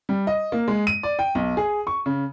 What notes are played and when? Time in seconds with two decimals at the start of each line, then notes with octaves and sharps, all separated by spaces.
0.09 G3
0.27 D#5
0.52 A#3
0.68 G#3
0.87 D#7
1.03 D5
1.19 G5
1.35 B1
1.57 G#4
1.87 C#6
2.06 C#3